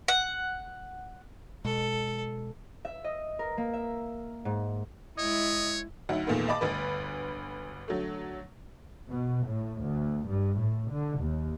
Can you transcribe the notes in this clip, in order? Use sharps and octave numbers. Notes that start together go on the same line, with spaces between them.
F#5
B2 G#3 A4
E5
D#5
A#4
A#3
E5
G#2
G#3 E4 C#5 D#5
D2 F#3 D#4 E5 F#5
E2 A#2 D#3 A3 B3
D#5 A5 B5 D6 A6
G1 D2 B4
D3 F#3 A3
B2
A2
D2
G2
A2
D3
D#2